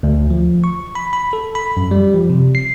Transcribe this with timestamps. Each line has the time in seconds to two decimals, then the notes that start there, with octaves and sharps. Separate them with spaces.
0.03 D2
0.30 F3
0.64 C#6
0.95 B5
1.13 B5
1.33 A4
1.55 B5
1.77 F#2
1.91 G3
2.15 F3
2.29 C3
2.55 C7